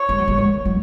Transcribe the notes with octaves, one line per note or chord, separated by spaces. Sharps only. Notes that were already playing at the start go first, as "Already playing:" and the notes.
Already playing: C#5
G#3
F#3
G#3
G#3
F#3